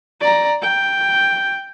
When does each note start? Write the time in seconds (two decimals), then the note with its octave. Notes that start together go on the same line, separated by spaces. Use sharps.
0.21 D5 A#5
0.62 G5